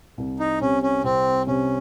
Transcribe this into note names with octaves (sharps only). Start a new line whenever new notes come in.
C2
D#4
C3 C#4
C#4
C2 C4
C3 C#4